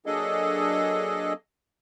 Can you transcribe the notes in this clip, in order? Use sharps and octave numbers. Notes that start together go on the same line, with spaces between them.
F#3 A#3 D4 G#4 A4 D#5